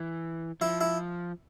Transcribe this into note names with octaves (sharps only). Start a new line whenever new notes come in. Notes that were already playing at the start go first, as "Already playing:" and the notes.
Already playing: E3
F3 E4
E4